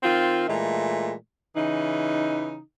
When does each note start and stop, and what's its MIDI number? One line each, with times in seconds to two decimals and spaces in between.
0.04 0.48 51
0.04 0.48 60
0.04 0.48 65
0.48 1.13 46
0.48 1.13 52
0.48 1.13 56
0.48 1.13 57
1.56 2.58 49
1.56 2.58 52
1.56 2.58 63